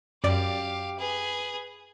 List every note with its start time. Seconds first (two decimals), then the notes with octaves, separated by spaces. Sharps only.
0.24 F#2 G4 D5 F5
0.99 G#4 B4